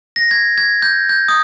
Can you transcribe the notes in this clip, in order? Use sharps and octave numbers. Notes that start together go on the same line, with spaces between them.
A#6
G#6
G#6
G6
G6
D#6